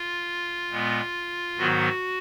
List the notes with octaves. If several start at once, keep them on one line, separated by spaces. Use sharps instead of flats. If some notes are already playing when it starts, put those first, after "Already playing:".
Already playing: F4
A#2 G#3 B3
G#2 D#3 F#3 B3 F#4